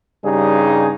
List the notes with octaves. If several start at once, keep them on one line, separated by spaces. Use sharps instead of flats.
G2 C#3 G3 D#4 G#4